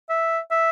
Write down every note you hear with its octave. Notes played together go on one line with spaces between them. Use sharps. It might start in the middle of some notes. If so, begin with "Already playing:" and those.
E5
E5